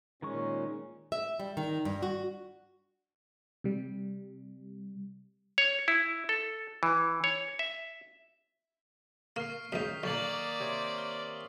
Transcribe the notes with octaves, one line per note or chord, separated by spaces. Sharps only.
A#2 D#3 G#3 C#4 C#6
E5
G3
D#3
G2
F#4
C3 G3
C#5
E4
A4
E3
C#5
E5
A#3 C#6 F6 C7
C#2 F#2 D#3 D#6 G6 B6 F7
B1 A#3 D5 C#6 A6 F#7
C3 C#5
F6